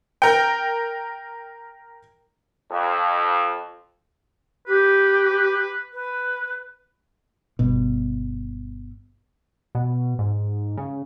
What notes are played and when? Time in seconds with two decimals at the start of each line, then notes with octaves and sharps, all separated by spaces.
0.22 A#4 G5
2.72 F2
4.67 G4 B4
5.93 B4
7.59 G1 B2
9.75 B2
10.19 G#2
10.77 C#3